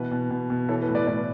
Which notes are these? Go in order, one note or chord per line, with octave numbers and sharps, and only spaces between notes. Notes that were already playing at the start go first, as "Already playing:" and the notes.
Already playing: B2 E3 B4
B2
B2
B2
E3 A4 C#5
B4
A2
B4 D5
A2 B4 D5